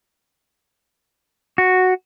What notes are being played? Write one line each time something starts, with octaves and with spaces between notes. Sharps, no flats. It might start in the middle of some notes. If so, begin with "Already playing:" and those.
F#4